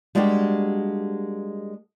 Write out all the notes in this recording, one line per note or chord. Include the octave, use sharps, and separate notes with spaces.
G3 G#3 A#3 D4 F#4 G4